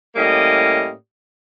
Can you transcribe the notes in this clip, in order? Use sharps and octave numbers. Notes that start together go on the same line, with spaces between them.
A2 G3 A#3 C#4 D#5